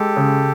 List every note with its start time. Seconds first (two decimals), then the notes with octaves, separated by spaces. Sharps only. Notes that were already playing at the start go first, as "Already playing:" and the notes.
Already playing: G#3 G4 A4
0.16 C#3